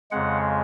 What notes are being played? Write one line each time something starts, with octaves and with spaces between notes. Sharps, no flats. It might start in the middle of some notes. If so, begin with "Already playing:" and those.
F2 C#3 G#3 F#5